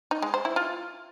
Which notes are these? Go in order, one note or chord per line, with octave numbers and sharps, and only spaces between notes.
D#4
G#3
C5
E4
F4